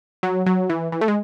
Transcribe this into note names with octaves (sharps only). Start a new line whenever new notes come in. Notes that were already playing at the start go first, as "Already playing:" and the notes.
F#3
F#3
E3
E3
A3
G#3